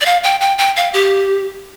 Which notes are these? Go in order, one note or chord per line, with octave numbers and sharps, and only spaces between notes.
D5
F5
G5
G5
G5
F5
G4